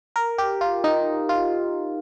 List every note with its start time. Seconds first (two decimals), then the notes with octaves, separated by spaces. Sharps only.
0.16 A#4
0.38 G4
0.61 F4
0.84 D#4
1.29 F4